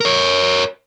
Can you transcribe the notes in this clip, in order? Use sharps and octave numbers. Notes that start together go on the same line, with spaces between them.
A#4 C#5